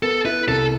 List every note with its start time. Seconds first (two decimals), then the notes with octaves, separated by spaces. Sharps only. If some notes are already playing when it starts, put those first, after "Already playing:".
0.03 B3 A4
0.25 E4 B4
0.48 C2 A4